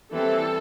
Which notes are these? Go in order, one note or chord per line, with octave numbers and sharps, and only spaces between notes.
E3 G3 C4 A4